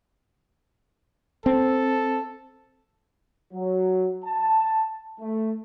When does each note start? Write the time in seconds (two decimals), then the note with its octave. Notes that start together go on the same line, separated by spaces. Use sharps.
1.46 C4 A4
3.53 F#3
4.25 A5
5.20 A3